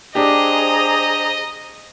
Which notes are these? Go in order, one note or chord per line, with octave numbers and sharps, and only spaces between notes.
D4 G4 G#4 C5 D#5 A#5